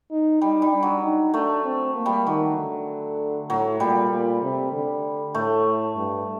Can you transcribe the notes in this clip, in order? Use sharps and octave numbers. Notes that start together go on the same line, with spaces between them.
D#4
G3 D#4
G3
D4
F#3
D#4
A3 D4
C4
A#3
G3
D#3 F#3
D3
A2 F#3
A#2 G3
A#2
C3
D3
A2 A3
G2